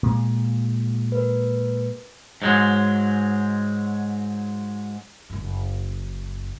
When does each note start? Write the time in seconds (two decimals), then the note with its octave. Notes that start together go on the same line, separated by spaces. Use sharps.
0.03 A#2 G#3
1.12 A#4 B4
2.42 G#2 F#3 G#3
5.30 F#1 F#2